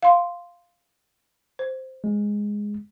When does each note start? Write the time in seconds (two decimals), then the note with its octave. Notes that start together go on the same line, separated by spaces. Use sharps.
0.03 F5 C6
1.59 C5
2.04 G#3